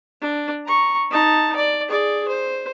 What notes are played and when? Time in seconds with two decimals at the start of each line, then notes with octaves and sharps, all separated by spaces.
0.21 D4
0.66 A#5 C#6
1.10 D#4 A5
1.56 D5
1.88 G#4 D5
2.28 C5